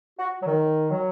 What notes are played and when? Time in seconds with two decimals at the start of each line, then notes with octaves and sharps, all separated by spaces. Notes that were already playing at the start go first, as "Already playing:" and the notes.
0.19 F#4
0.41 F#3
0.46 D#3
0.91 F#3